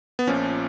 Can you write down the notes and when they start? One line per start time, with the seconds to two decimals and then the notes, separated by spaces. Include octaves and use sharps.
0.19 B3
0.27 A#1 A#2 F3 C#4